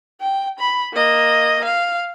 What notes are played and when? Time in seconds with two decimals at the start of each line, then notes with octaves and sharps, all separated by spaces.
0.20 G5
0.59 B5
0.93 A#3 D#5
1.64 F5